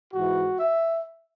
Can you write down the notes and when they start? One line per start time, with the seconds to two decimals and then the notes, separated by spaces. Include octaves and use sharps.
0.12 G#2 E3 F#4
0.59 E5